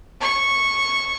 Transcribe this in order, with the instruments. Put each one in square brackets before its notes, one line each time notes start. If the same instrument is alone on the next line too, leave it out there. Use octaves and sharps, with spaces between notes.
[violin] C#6